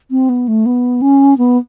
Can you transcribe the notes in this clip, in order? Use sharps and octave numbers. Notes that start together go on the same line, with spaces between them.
C4
B3
A3
B3
C#4
B3